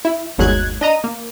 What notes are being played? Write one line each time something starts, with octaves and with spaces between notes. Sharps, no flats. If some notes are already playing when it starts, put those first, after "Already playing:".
E4
G1 D#2 F#3 G#3 F#6 G#6
D4 D#5 A#5 D#7
A#3